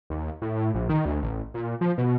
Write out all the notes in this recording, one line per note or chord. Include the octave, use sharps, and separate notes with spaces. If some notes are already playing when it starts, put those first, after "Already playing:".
D#2
A2
A#1
D#3
D2
A1
A#2
F3
B2